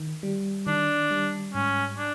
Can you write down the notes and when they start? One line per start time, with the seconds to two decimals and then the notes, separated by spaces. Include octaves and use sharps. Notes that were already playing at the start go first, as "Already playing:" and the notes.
Already playing: D#3
0.23 G3
0.67 D#3 D4
1.11 G3
1.54 G#2 C#4
1.98 D4